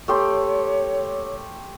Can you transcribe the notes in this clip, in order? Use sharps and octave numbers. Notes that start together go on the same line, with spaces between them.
A3 G4 C#5 C6